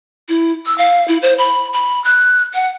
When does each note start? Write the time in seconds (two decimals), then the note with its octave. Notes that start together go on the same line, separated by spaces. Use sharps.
0.29 E4
0.66 E6
0.78 F5
1.08 E4
1.22 C5
1.38 B5
1.73 B5
2.04 F#6
2.54 F#5